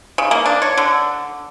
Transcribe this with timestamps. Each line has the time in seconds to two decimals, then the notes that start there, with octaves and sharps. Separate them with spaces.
0.18 C#3
0.31 A#3
0.46 D4
0.62 C#5
0.78 D3